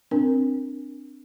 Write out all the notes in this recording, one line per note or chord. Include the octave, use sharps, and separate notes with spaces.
C4 D4 A#4